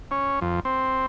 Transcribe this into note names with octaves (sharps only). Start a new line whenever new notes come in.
C#4
F2
C4